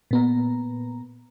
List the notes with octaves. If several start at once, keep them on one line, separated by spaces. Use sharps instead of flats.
A#2 B3 A#5